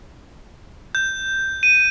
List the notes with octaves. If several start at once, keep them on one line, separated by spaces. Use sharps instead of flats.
G6
D#7